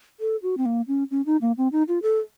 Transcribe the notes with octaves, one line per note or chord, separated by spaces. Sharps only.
A4
F#4
C4
A#3
C#4
C#4
D#4
A#3
C4
D#4
F4
A4